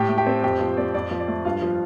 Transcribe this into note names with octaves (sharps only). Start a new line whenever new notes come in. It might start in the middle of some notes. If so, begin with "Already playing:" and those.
Already playing: A2 G4 G5
A3
G4 G5
C4
F2 G4 G5
F3 C5
C4 D5
F2 D5
F3
D5
A3
G2 F4 F5
F3